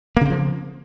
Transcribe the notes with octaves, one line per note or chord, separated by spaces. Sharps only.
C#3 F3 A#3 C4